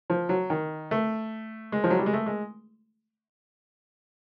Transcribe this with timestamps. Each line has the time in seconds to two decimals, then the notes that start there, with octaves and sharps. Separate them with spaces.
0.10 F3
0.29 F#3
0.50 D#3
0.91 A3
1.72 G#3
1.84 F3
1.90 F#3
1.99 G3
2.06 G#3
2.13 A3
2.26 G#3